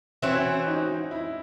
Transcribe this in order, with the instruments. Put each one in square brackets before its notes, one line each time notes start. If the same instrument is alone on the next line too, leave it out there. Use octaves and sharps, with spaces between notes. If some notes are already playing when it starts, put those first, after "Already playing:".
[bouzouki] E3 C4 F#4 [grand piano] C#4
[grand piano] D#4
E4